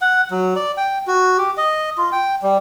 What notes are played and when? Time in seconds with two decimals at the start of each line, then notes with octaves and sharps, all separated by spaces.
0.01 F#5
0.31 F#3
0.56 D5
0.77 G5
1.07 F#4
1.38 G4
1.57 D#5
1.98 F4
2.12 G5
2.42 G3